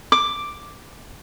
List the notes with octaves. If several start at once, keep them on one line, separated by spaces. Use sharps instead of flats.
D6